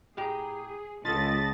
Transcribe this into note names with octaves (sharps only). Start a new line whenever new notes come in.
A2 G4 G#4 A#5
C#2 F4 A4 D#5 A5 B5 A6